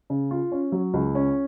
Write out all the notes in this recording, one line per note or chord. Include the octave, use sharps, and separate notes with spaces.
C#3
F4
C#4
F#3
C#2
C#4